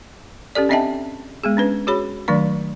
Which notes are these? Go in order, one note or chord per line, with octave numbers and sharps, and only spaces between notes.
C#4 G4 A4 D5
C4 D4 D#5 E5 G5 A5
G#3 B3 G#4
C#4 D4 B4
F#4 G#4 C#5 B5
D#3 F#3 A3 D4 D5